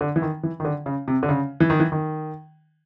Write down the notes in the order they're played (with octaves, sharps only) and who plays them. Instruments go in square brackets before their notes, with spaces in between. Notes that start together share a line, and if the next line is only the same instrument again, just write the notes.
[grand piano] D3
E3
D#3
E3
D#3
D3
C#3
C3
D3
C#3
E3
D#3
E3
D#3